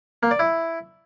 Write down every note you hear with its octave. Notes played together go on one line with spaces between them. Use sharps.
A#3
D5
E4